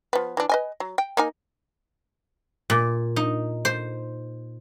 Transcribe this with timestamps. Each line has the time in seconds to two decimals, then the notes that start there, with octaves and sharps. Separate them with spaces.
0.13 F3 B3
0.37 E3 D4
0.49 B4 D#5 G#5
0.80 F#3
0.98 G5
1.17 A#3 D#4 G#5
2.70 A#2
3.16 D#4
3.65 C5